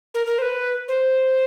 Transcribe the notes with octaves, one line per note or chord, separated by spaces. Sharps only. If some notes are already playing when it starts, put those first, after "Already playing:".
A#4
A#4
C5
B4
C5